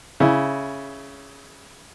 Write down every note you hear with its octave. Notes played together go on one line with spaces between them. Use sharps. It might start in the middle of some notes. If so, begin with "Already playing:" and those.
C#3 E4